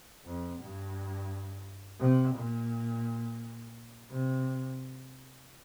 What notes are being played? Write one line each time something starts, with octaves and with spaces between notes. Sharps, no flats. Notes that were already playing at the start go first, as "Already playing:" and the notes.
F2
G2
C3
A#2
C3